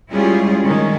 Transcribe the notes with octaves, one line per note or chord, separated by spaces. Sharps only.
G3 G#3 C#4 E4 F4 G#4
D#3 A3 C#4